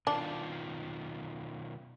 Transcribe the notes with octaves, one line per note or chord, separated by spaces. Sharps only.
B2 D#3 D4 F4